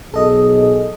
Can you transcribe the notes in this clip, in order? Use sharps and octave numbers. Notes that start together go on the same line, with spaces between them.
B1 G#4 A4 D#5